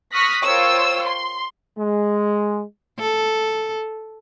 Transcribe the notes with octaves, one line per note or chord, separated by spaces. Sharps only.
C#6 D#6 F6 F#6 A#6 B6
F4 A#4 C5 C#5 G5 E6
C6
G#3
A4